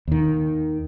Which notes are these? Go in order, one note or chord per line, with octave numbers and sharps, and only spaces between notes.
D#2 D#3